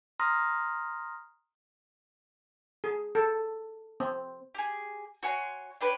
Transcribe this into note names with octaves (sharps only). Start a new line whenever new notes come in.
A#5 C6 D#6 F6 A#6
G#4
A4
C4
G4 G#4
F#4 C#5 G#5 C6
D4 G4 B4 C#5